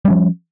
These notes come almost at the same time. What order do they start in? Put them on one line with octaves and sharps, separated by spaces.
G3 C#4 F3